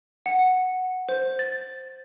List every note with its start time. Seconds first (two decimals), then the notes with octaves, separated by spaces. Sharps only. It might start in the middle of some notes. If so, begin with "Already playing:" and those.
0.26 F#5
1.09 C5
1.39 A6